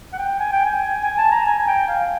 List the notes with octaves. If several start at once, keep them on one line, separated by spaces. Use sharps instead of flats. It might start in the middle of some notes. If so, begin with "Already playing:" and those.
F#5
G5
G#5
G5
G#5
G#5
A5
A#5
G#5
G#5
G5
F5